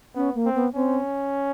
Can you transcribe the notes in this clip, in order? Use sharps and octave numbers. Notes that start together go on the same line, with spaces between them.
B3 C#4
A#3
C4
B3
C4 C#4